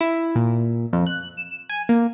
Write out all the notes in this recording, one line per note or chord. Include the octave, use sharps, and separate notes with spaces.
E4
A#2
F2
F#6
E7
G#5
A#3